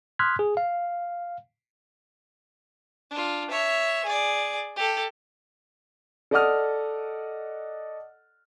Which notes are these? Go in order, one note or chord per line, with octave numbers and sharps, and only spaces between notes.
C6 D#6 F6 F#6 G#6 B6
G#4
F5
D4 F4
C#5 E5
G#4 D5
G4 A4
A4 D5 D#5 F#5 D#6 F6